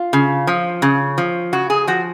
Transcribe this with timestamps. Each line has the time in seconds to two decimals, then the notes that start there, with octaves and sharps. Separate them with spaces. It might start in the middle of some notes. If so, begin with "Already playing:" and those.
Already playing: F4
0.13 C#3
0.47 F3
0.82 C#3
1.18 F3
1.53 C#3 F#4
1.70 G#4
1.87 F3 F#4